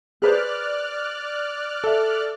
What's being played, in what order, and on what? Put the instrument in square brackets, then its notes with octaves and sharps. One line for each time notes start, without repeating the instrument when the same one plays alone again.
[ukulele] G#4 B4 C5 [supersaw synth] D5 F6 F#6
[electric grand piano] A4 E5